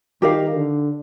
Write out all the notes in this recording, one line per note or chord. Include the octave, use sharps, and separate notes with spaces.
D#3 G4 A#4 F5
D3